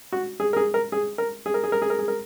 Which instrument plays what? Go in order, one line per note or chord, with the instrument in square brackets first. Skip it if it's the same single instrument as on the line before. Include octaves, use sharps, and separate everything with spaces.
[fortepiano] F#4
G#4
A#4
G#4
A#4
G#4
A#4
G#4
A#4
G#4
A#4
G#4
A#4
G#4
A#4